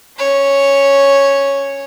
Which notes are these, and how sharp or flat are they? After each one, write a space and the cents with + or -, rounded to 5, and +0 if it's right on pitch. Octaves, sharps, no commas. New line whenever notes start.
C#4 +0 C#5 +0